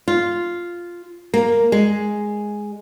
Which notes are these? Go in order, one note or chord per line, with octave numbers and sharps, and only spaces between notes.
F4
A#3
G#3